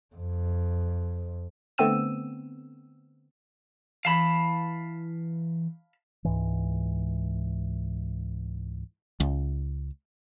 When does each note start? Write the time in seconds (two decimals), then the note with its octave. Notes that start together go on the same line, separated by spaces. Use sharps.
0.16 F2
1.78 D3 A3 B3 C4 E6 D#7
4.05 E3 F5 A5 B5
6.25 C#2 G#2 E3
9.20 C#2